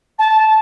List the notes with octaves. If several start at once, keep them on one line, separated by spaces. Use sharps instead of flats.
A5